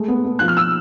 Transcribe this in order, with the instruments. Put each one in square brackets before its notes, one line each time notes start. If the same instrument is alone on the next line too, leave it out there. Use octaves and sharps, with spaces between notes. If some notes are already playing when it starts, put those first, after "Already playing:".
Already playing: [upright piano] G#3 A3
B3
B3
F3 F#6
F6
F3 E6